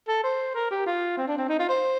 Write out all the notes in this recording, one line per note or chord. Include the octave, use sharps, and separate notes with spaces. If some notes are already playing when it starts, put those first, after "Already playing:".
A4
C5
A#4
G4
F4
C4
D4
C4
D#4
F4
C5